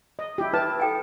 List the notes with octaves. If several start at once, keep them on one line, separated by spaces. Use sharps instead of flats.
D#5
E4 G4
E4 B4 A5
A4 G5 G#5